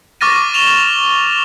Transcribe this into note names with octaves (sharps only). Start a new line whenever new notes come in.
C#6 D6 F6 A6 A#6 D#7
E7 F7 G7